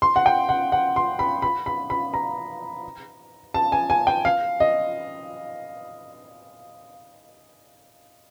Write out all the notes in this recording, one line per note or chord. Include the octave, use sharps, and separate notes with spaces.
C6
F#5
G5
F#5
F#5
C6
B5
B5
B5
B5
A#5
A5
G#5
G#5
G5
F5
D#5